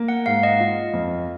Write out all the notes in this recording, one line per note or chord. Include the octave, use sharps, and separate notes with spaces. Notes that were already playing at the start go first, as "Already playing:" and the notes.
Already playing: A#3
F#5
G#2 F5
D#5
F4
F2